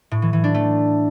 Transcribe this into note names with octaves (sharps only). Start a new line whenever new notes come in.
A2
E3
E3
D4
A3